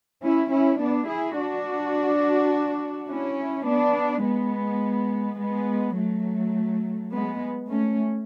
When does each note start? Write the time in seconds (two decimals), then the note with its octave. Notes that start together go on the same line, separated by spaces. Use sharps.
0.24 C#4 E4
0.52 C#4 E4
0.81 B3 D4
1.09 E4 G#4
1.38 D4 F#4
3.10 C#4 E4
3.67 B3 D4
4.25 G#3 B3
5.40 G#3 B3
5.97 F#3 A3
7.12 G#3 B3
7.69 A3 C#4